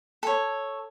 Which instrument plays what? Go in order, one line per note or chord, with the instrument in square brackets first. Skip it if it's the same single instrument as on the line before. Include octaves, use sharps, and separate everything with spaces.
[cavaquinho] A4 C#5